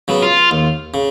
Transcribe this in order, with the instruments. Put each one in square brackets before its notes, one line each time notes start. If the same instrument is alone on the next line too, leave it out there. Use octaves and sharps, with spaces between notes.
[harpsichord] C#3 F#3 B3
[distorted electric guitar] F4
[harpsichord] D#2
C#3